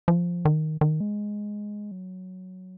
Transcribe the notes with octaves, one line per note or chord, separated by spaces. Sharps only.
F3
D#3
D#3
G#3
F#3